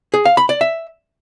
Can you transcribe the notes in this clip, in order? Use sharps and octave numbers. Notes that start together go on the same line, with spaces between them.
G#4
F5
B5
D5
E5